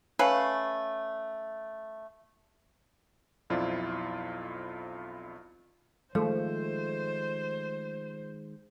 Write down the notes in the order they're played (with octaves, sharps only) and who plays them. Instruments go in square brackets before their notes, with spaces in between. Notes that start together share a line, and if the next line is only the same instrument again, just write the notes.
[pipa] A3 C#4 B4 F5
[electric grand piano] B1 F2 E4 F4 C5 D5
[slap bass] D#3 G#3 [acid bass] F3 [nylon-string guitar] A3 [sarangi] C5